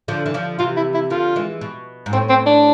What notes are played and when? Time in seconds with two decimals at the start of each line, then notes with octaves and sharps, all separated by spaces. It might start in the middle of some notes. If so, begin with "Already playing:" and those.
0.08 D3 F3
0.26 E3
0.34 D3 F3
0.59 C3 E3 F4
0.77 E4
0.94 E4
1.10 D3 F3 F4
1.36 E3 G#3
1.61 B2
2.06 G#2
2.13 A2 C4
2.29 C4
2.46 D4